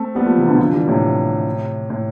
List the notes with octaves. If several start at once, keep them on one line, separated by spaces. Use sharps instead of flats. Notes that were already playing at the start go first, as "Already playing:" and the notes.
Already playing: A3 C4
G3 B3
F3 A3
C3 E3
B2 D3
D3 F3
E3 G3
A2 C3
A2